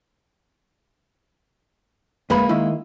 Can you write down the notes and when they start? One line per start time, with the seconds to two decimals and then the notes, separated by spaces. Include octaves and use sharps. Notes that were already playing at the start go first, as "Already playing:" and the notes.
2.30 D2 G#3 A#3 B4 B5
2.49 D#3 E4